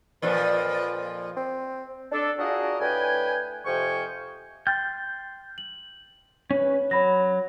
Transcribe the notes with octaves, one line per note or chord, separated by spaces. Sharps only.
F2 A#2 F3 B4
C4
D4 A4
D4 F4 F#4 G#4 A#4 D#5
A2 D4 B4 G5 G#5
F2 C3 F3 G5 G#5 C#6
G5 C6 F6 G6 A6
F#7
C#4 B4 C#5
F#3 C#5 B5 A#6